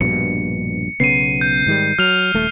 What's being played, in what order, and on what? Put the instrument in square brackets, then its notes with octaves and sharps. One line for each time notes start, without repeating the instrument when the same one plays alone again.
[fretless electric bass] A#1 G2 B2 [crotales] C#7
[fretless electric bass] B1 C#3 B3 [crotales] C7 D#7
[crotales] G6
[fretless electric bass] G#2 D#3 G3
[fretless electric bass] F#3 [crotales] F6 F7
[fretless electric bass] D#1 A3